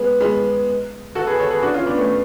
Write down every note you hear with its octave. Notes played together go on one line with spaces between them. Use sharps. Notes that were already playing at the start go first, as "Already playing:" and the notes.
Already playing: G#3 B3
G#3 B3
F#4 A4
G#4 B4
A4 C#5
G#4 B4
D4 F#4
C#4 F4
B3 D4
A3 C#4